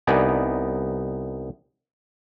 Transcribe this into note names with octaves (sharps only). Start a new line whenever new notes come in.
C2 B3 D#4 D5 G#5